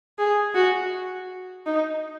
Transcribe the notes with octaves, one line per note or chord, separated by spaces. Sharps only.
G#4
F#4
D#4